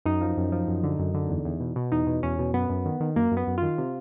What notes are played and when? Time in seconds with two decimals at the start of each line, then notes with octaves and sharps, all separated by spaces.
0.05 F#2 D#4
0.21 F3
0.37 F#2
0.52 F3
0.68 F#2
0.83 D3
0.99 F#2
1.14 D3
1.29 E2
1.45 E2
1.60 B2
1.76 B2
1.92 E2 D#4
2.07 B2
2.23 E2 C#4
2.39 B2
2.54 F#2 B3
2.70 F#2
2.85 D#3
3.00 D#3
3.16 F#2 A#3
3.32 F#2
3.37 B3
3.47 F#2
3.58 D#3 F4
3.78 C3